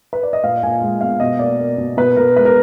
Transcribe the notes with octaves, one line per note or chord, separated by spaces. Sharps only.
B4
D5
D#5
A#2 F5
A#2 G#5
G#3
B3 F5
B2 D#5
A#3 D5
A#3
B2
B2 B4
B2 A#4
G#3 B4
A#4